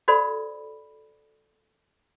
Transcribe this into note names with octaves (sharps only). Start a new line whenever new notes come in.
F#4 A4 C5 D5 B5